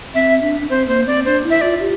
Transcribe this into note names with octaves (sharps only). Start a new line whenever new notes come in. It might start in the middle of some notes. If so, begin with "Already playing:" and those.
C4 E5
D4
D4
C4 C5
A#3 C5
C4 D5
D4 C5
E4
E5
F4 D5
G4